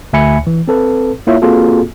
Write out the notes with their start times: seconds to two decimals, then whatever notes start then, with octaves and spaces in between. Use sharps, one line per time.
0.13 D2 E5 G#5 B5 C#7
0.47 E3
0.68 C4 A4 B4
1.27 A#3 E4 F4 C#5 E5
1.42 A#3 C4 F4 F#4 G#4 A4